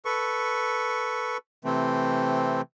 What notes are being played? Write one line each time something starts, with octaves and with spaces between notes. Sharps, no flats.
A4 B4 C#6
C3 E3 A3 C4